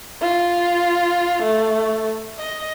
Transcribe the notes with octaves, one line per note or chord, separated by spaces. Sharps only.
F4
A3
D#5